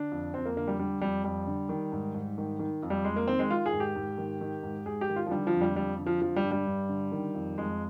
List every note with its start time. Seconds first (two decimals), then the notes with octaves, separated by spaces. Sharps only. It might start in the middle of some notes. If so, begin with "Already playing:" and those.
Already playing: D3 D4
0.11 F2
0.34 F2 C4
0.46 A#3
0.56 D3 A#3
0.67 G3
0.79 D3 G3
1.01 F2 G3
1.24 F2 G3
1.47 D3
1.69 D#3
1.92 G#2
2.15 G#2
2.38 D#3
2.59 D#3
2.83 F2
2.90 G3
3.05 F2 G#3
3.16 A#3
3.27 D#3 C4
3.39 G#3
3.50 D#3 F4
3.66 G#4
3.73 G#2
3.80 G4
3.96 G#2
4.18 D#3
4.41 D#3
4.63 G#2
4.86 G#2 G#4
5.01 G4
5.09 D#3
5.16 F4
5.27 F3
5.31 D3 G3
5.47 F3
5.54 F2
5.61 G3
5.76 F2 G3
5.99 D3
6.06 F3
6.22 D3 F3
6.36 G3
6.44 G2
6.51 G3
6.66 G2
6.89 D3
7.12 D#3
7.35 F2
7.58 F2 G#3